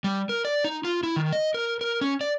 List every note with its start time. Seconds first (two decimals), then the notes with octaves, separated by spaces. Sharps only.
0.04 G3
0.29 A#4
0.45 D5
0.64 D#4
0.84 F4
1.03 E4
1.16 D#3
1.32 D#5
1.54 A#4
1.81 A#4
2.01 C#4
2.21 D5